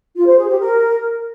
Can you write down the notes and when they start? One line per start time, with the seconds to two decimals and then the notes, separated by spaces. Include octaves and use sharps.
0.16 F4
0.27 C5
0.38 G#4
0.49 G4
0.59 A#4